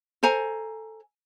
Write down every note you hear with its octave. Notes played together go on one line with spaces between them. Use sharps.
A4 C5 G#5 A#5